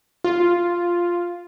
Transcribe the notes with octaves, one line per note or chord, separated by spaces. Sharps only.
F4